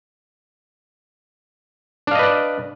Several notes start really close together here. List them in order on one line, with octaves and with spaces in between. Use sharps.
D4 F5 D#5 B4 D5